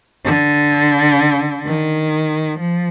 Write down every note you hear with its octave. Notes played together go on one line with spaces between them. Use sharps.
D3
D#3
F3